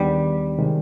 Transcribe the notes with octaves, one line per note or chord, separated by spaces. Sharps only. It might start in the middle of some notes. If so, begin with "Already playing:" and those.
Already playing: D#2 D#3 G3 B3 D4 G4
C3 D#3 G#3